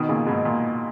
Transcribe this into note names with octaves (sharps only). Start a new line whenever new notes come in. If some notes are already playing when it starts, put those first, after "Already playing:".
Already playing: B2 D#3
A#2 C#3
G#2 B2
A#2